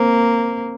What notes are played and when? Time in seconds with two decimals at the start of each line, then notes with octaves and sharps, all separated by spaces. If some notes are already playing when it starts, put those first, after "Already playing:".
Already playing: A#3 C4